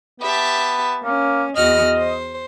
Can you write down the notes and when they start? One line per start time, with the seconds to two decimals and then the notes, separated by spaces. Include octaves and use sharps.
0.20 B3 G4 E5 A5
1.04 A#3 C#4
1.55 E2 F#4 D#5 F6
1.96 C5